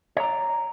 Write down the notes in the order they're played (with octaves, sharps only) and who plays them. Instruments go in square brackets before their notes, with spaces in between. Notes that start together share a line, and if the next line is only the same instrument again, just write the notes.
[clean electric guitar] C#5
A#5
D5